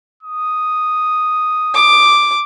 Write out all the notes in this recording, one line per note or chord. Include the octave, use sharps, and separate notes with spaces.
D#6
D6